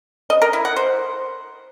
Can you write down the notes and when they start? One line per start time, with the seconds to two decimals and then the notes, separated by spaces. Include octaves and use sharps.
0.30 D#5
0.42 A#4
0.53 E4
0.65 F#5
0.76 C5